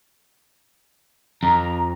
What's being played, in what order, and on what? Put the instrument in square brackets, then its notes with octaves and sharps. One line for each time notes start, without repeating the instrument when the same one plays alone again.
[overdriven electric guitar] F2 [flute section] A#5